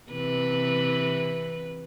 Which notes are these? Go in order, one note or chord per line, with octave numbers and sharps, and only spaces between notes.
C3 E3 B4